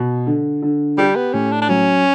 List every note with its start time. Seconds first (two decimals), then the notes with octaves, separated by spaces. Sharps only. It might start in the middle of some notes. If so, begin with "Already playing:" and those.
Already playing: B2
0.27 D3
0.62 D3
0.98 G3 G4
1.16 B3
1.33 A2 C#4
1.51 D4
1.62 D4
1.69 F#3 C#4